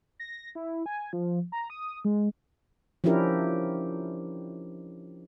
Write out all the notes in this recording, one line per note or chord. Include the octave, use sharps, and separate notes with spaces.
A#6
E4
G#5
F3
A#5
D#6
G#3
F3 C#4 D4 E4 G4 A#4